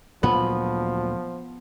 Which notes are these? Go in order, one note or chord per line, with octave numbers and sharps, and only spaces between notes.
D2 A#2 F3 F#3 B3